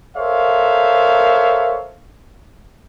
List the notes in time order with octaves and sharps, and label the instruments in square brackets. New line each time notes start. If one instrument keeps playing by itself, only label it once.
[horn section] A4 A#4 C5 C#5 E5 F5